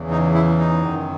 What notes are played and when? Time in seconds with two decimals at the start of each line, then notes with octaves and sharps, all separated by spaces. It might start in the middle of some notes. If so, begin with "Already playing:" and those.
Already playing: E2 C#3 E3
0.11 D#4
0.34 E4
0.59 D#4
0.82 F#2 D#3 F#3